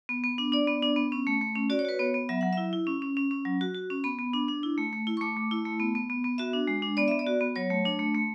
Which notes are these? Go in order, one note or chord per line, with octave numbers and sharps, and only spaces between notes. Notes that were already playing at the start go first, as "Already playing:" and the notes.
B3
B3
D4
D4 D5
B3
D4
B3
C#4
A3
A3
C#4
F#4 D5
C#5
F#4 B4
B3 C#5
B3
F#3 E5
F#3 F#5
E4 E5
E4
C#4
C#4
C#4
C#4
F#3
F#4
F#4
C#4
B3 B5
B3
D4
D4
E4
A3
A3
E4
C#6
A3 D6
A3
E4
A3
B3
B3
B3
B3
F#4 E5
D4
G#3
D4
B3 D5
B3 E5
D5
F#4
B3
F#3 C#5
A3
D4
A3
A3